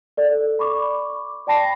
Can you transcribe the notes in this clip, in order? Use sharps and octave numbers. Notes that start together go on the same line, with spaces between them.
A4 D5
B5 C#6 D6
D5 G5 A5 B5 A#6 C7